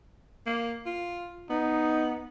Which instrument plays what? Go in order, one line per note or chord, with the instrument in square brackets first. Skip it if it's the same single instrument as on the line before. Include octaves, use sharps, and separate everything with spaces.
[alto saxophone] A#3
F4
[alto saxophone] B3 [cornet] D#4